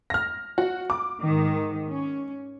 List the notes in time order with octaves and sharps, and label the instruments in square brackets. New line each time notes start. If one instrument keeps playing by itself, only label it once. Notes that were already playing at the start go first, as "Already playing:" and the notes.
[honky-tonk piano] F6 A#6
F#4
D6
[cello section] G#2 D#3
C#4